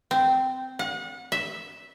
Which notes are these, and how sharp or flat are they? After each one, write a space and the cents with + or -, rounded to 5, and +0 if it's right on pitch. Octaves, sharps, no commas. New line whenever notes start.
C4 -15
F#5 -35
E5 -5